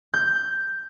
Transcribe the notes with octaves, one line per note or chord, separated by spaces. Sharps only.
G6